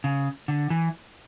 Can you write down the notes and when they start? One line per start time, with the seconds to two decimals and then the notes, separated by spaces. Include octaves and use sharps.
0.04 C#3
0.48 D3
0.70 E3